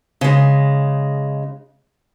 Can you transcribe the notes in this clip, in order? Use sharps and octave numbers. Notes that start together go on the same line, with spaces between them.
C#3 G#3